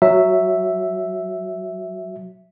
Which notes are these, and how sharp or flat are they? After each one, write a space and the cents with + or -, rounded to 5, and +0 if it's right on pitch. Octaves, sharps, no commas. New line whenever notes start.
F#3 +0 E5 +0